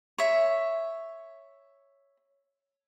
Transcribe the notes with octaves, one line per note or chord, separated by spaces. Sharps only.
C#5 E5